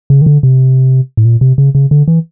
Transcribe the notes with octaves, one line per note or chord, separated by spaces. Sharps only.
C#3
D#3
D3
C3
A2
A#2
C3
C#3
C#3
D3
E3